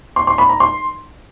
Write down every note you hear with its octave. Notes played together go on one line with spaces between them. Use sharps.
C6
C6
B5
A#5
C6